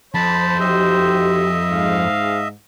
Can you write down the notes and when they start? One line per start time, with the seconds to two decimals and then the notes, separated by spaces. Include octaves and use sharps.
0.14 F2 C5 A5 B5
0.60 D#4 F#4 G4 D#5 E5
1.71 G#2 F5